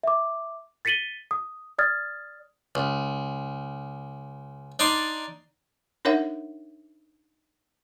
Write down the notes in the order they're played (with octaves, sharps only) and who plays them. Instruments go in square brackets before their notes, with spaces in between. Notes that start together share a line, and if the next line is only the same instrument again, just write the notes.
[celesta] E5 D6
A6 B6 C#7 D#7 F#7 G7
D#6
D5 D#6 F6 G#6 A6
[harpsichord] C#2
D4 D#4 D5 C6
[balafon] D4 D#4 A#4 C#5 E5 F#5